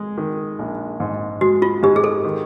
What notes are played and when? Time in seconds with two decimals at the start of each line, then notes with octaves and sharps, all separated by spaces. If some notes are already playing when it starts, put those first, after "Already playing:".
Already playing: G#3
0.18 D#3
0.59 A#1
1.00 G#2
1.41 G#3 F#4
1.62 F4
1.83 G#2 G4
1.96 G#4
2.04 A4
2.25 D#3